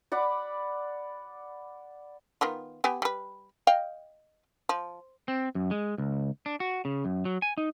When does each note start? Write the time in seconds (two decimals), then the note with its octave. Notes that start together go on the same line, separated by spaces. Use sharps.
0.12 D5 F#5 B5 D6
2.41 D#3 B3 F4
2.84 B3 G4 G#5
3.02 G3 B4
3.67 D#5 F5 G5
4.69 F3
5.28 C4
5.55 F#2
5.71 G#3
5.98 C#2
6.46 D4
6.60 F#4
6.85 C#3
7.05 F#2
7.25 F#3
7.42 G#5
7.58 D#4